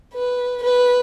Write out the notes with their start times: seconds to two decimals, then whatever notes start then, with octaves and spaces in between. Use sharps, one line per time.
0.14 B4
0.63 B4